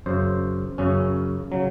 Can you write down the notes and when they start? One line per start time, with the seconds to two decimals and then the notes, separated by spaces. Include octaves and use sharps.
0.06 F#2 C#3 C5
0.78 F#2 C#3 C#4
1.52 C#3 F#3